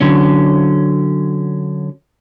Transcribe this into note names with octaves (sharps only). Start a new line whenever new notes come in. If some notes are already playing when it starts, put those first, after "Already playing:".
D3 F#3 C#4